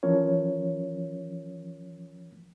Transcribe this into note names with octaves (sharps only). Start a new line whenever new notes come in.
E3 F3 C#4 A#4 C#5